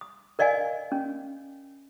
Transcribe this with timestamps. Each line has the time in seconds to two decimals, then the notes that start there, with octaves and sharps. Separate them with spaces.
0.01 D#6
0.39 A#4 D5 D#5 F5 G#5
0.92 C#4